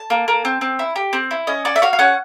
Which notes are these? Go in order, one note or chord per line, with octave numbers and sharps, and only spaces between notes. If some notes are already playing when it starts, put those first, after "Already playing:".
Already playing: A5
A#3
A#3
C4
C4
E4
G4
C4
E4
C#4 D#5
F#4 D5
E5
F#4 F5
F5
C#4 F#5